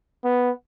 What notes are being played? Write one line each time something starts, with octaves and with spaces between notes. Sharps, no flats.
B3